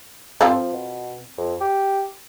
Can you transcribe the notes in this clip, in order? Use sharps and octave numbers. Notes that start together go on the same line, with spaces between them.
G2 C4 F4 A4
F3
B2
F2
G4